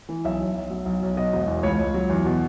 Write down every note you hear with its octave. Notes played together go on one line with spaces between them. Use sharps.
E3
B1 E5
B1
B1
F#3
B1
B1
B2 D#5
E1
E2
C#2 C#5
C#2
F#3
E2
B2